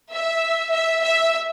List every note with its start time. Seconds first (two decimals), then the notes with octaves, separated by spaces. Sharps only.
0.12 E5
0.72 E5
1.02 E5